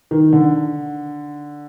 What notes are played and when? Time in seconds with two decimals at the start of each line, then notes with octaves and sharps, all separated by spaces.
0.11 D#3
0.33 D3